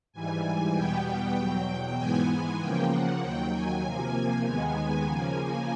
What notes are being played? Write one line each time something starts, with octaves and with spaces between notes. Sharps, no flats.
G#2 E3 G3 G#5
E2 B2 G3 B3 G5
E2 B2 F#3
G#2 E3 G#3 B3 G#5
G#5
C#3 F3 A#3 G5
F#5
D#2 D#3 F#3 G5
G#5
C3 F3 A#3
D#2 D#3 G#3 B3 G#5
C#3 F3 A#3